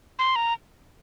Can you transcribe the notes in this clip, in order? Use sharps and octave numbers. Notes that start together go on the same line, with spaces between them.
C6
A#5